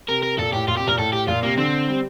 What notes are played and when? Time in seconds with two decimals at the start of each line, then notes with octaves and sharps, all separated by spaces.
0.08 C3 A#4
0.23 A#4
0.39 A#2 A4
0.53 A2 G4
0.68 A#2 F4
0.77 C3 G4
0.88 A#2 A#4
0.98 A2 A4
1.13 G4
1.28 A#2 F4
1.43 C3 A#3
1.57 D3 C4
1.88 G3